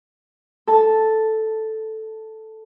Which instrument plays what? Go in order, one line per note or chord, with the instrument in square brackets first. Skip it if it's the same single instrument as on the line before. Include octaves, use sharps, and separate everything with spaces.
[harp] A4 A5